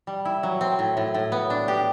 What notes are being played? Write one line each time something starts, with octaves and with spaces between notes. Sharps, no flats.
G3
E4
F#3
C4
A2
A2
A2
B3
D4
G4